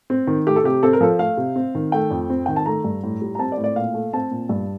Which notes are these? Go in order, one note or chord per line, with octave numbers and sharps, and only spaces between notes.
C4
D#3
A3 G4
A4
C3 G4
C4 A4
A#4
F3 A4
A3 F5
C3
C4
D#3
A3 G5
F2
C4
D#3 G5
A5
A3 A#5
G2
A2
G3
A#5
C4 A5
D5
A2
D5
A#2 F5
A3
C4 A5
A#2
G2